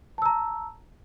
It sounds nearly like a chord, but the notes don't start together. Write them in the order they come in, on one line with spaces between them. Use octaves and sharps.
A5 E6 A#5